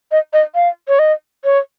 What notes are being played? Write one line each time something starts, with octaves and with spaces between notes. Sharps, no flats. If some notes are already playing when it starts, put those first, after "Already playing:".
D#5
D#5
F5
C#5
D#5
C#5